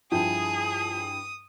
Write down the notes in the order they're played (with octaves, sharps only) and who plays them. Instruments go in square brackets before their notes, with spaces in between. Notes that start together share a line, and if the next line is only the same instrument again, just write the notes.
[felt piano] G2 E4 G5 [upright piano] F3 [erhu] G#4 [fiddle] D#6